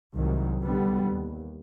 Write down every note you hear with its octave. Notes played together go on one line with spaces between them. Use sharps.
C2 G#2 D#3 F#3
B1 D3 G3 B3
D#2